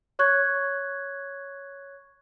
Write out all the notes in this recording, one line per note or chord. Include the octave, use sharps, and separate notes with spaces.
C#5 C#6 F#6 G#6